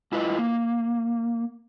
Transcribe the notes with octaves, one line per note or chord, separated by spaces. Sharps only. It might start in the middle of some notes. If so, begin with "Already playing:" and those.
G#2 E4 F4 B4 D#5
A#3